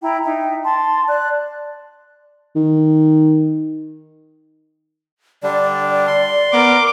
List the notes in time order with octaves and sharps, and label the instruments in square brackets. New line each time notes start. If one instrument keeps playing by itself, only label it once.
[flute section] E4 G5 A#5 B5
D#4 E5 G5
A5 C6
D5 F#6
[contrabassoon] D#3
[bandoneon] D3 G3 D4 [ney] D5
[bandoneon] C6
[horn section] B3 A#4 [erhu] D6